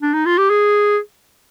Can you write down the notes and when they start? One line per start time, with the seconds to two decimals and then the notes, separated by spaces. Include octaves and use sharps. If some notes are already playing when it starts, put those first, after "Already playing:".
0.01 D4
0.14 D#4
0.26 F4
0.38 G4
0.50 G#4